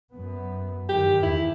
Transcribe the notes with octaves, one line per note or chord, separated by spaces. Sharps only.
F#2 B3
G2 D#3 G4
E2 E4